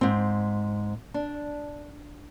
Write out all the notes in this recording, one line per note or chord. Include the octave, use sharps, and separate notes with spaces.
G#2 C4
D4